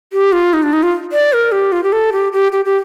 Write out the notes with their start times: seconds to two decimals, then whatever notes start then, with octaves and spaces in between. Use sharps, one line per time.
0.13 G4
0.32 F4
0.53 D#4
0.63 D4
0.73 D#4
0.83 F4
1.12 D5
1.33 A#4
1.52 G4
1.72 F4
1.83 G4
1.92 A4
2.12 G4
2.33 G4
2.52 G4
2.65 G4